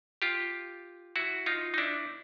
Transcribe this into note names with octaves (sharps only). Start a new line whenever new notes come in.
F4 G4
E4 F#4
D#4 F4
D#4
D4 E4